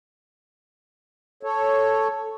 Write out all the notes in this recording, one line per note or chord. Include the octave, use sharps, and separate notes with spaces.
A4 C#5